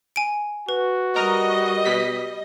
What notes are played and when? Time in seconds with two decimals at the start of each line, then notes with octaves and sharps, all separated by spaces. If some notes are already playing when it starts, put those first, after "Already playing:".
0.16 G#5 D7
0.69 F#4 B4
1.16 G3 A#4 D#5 A#5
1.86 B2 B6